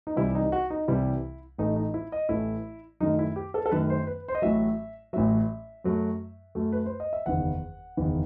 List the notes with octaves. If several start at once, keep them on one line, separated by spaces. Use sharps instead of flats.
D#4
C2 C3 E3 G3 E4
D#4
F#4
D#4
C2 C3 E3 G3 E4
A1 A2 E3 A3 D#4
D#4
E4
D#5
A1 A2 E3 A3 E4
F#2 D#3 A3 D#4
E4
G4
A4
A4
F#2 D#3 A3 B4
C5
B4
C5
D#5
A1 A2 F#3 E5
A1 A2 F#3 E5
F#2 F#3 A3
F#2 F#3 A3
B4
C5
D#5
E5
F#1 E2 D#3 F#5
F#1 E2 D#3